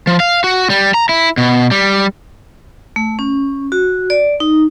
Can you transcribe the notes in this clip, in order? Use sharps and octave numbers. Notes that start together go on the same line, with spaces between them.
F3
F5
F#4
G3
A#5
E4
B2
G3
A3
C#4
F#4
D5
D#4